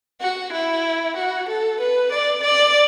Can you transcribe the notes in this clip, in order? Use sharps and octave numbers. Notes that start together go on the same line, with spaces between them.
F#4
E4
F#4
A4
B4
D5
D5